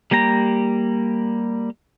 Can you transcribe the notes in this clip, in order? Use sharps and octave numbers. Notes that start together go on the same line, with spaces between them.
G3 A#3 G4 A#5